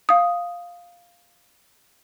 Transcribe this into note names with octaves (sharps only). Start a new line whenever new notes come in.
F5 D#6